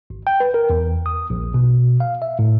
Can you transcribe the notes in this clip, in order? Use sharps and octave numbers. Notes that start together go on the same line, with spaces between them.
G#1
G5
B4
A#4
E2
D#6
A#1
B2
F5
E5
A2